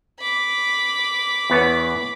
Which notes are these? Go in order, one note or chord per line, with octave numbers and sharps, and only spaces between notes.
B5 D6
E2 B3 C#5